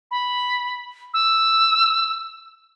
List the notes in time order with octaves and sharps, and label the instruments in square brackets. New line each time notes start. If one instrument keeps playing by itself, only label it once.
[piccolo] B5
E6